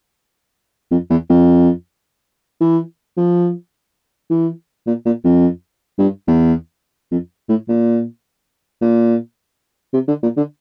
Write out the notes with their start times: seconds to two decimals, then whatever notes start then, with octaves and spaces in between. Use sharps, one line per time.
0.91 F2
1.10 E2
1.30 F2
2.61 E3
3.17 F3
4.30 E3
4.87 A#2
5.06 A#2
5.24 F2
5.99 G2
6.28 E2
7.12 F2
7.49 A2
7.69 A#2
8.82 A#2
9.94 C3
10.08 D3
10.23 A#2
10.37 D3